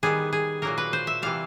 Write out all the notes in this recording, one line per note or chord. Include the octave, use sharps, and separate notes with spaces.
D#3 G3 B3 G#4
G#4
A#2 F#3 A#3 A#4
B4
C5
E5
C3 E3 G3 F5